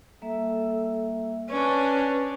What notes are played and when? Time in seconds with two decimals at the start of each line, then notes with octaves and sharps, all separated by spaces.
0.22 G3 A#3 A4 E5
1.51 C#4 D4 B4 C#5 D5